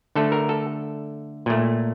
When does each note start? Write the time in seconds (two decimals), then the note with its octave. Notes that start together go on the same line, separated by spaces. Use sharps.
0.15 D3 A3 A4
0.32 A#4
0.49 A4
1.46 A#2 A3